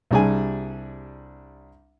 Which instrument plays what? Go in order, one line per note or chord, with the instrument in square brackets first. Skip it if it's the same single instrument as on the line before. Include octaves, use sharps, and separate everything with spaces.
[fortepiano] C2 G3 D4 G#4 G#5